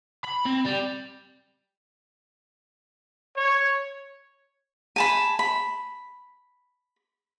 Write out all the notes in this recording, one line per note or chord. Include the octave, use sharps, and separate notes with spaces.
B5
C4
G3
C#5
G#5 A5 B5
B5